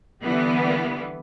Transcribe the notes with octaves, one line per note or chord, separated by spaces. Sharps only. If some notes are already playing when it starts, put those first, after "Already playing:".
D3 E3 G3 B3